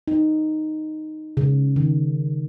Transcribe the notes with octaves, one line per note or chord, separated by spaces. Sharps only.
D#4
C#3
D#3